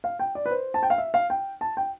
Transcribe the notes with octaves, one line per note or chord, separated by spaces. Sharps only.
F5
G5
D5
B4
C5
A5
G5
F5
E5
F5
G5
A5
G5